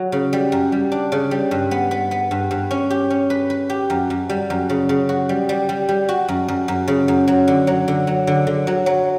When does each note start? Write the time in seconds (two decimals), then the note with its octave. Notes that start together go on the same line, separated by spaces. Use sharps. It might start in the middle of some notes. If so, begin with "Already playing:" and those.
Already playing: F#3
0.12 C#3
0.33 G3
0.52 F#2
0.72 G3
0.92 D4
1.12 C#3
1.31 G3
1.51 G2
1.71 B3
1.91 B3
2.11 B3
2.31 G2
2.51 G2
2.71 C#4
2.90 G4
3.10 C#4
3.30 B4
3.50 B4
3.70 G4
3.90 F#2
4.10 F#2
4.29 G3
4.50 F#2
4.69 C#3
4.89 C#3
5.09 F#4
5.29 G3
5.49 G3
5.69 G3
5.89 G3
6.09 F#4
6.28 F#2
6.48 F#2
6.68 F#2
6.88 C#3
7.08 F#2
7.27 F#3
7.47 D3
7.67 F#3
7.88 D3
8.07 F#3
8.27 D3
8.47 D3
8.67 F#3
8.86 F#3